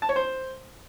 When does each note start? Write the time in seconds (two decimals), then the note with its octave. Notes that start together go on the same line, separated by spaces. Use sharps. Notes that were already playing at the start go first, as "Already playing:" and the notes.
0.02 A5
0.09 C#5
0.16 C5